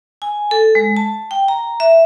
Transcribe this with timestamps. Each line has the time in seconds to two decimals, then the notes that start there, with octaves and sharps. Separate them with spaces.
0.22 G#5
0.51 A4
0.75 G#3
0.97 A5
1.31 G5
1.48 A#5
1.80 E5